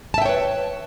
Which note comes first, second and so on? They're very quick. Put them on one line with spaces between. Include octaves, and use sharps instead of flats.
A5 E5 G5 C#5 B4